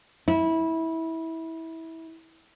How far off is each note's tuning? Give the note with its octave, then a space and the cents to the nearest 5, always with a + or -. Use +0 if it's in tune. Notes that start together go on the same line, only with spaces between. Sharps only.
E4 -20